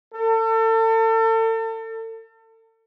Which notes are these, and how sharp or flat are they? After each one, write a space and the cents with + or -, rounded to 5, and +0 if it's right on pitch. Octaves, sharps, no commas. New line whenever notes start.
A4 +35